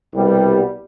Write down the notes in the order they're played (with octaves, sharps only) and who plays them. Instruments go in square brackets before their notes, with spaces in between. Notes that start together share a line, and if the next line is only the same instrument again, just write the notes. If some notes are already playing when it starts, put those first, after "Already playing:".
[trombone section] C2 B2 G3 B3